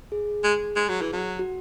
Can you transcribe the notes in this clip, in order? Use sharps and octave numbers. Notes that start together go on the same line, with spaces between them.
G#4
G#3
G#3
F#3
E3
F#3
F#4